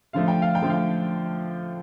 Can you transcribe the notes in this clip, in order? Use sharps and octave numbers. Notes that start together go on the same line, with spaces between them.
D3 F3 A3 F5
G5
F5
G5
D3 F3 A3
F5